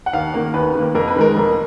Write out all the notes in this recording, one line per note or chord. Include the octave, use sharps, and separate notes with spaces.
F#5
D#2 F5
D#3 A#3
D#2 B4
D#3 A#3
F2 A#4
B4
D#3 G#3 A#4
F2